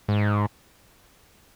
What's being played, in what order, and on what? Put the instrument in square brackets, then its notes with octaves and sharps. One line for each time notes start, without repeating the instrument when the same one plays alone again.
[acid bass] G#2